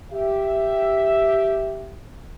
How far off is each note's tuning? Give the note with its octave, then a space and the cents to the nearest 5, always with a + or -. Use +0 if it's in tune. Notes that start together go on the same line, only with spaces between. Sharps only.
G4 -5 E5 +5